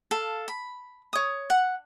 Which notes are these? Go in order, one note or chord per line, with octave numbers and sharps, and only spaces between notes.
A4 F5
B5
C#5 D#6
F#5